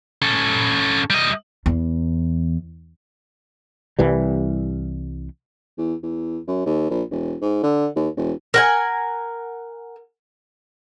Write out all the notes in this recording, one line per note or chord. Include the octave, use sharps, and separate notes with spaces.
C#4 A4
G3 D#5
E2
C2 E3 G3
E2
E2
F#2
D#2
A#1
E1
G#2
D3
D#2
E1
A#4 F#5 G#5